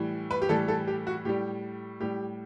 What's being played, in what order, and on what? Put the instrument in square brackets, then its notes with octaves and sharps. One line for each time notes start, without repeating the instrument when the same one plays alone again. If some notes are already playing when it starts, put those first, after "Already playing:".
Already playing: [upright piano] A2 E3 G3
B4
G4
A2 E3 G3 A4
A4
G4
F#4
A2 G3 G4
A2 G3 G4